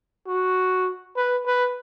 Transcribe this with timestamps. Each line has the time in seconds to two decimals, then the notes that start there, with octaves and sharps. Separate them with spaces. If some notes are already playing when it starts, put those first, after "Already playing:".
0.27 F#4
1.16 B4
1.46 B4